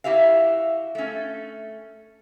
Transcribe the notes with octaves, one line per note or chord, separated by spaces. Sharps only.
E4 F#4 G4 E5 F5
A3 C#4